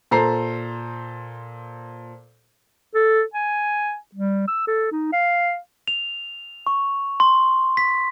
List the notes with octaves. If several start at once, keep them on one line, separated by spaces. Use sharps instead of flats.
A#2 A4 C5 A#5 C7
A4
G#5
G3
E6
A4
D#4
F5
F7
C#6
C6
B6